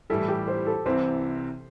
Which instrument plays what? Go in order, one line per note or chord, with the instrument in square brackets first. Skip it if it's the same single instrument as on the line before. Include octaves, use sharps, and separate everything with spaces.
[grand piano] A2 E3 G3 E4 [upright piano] A4
[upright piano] G4
C5
A4
[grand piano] C2 C3 E3 C4 [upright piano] C5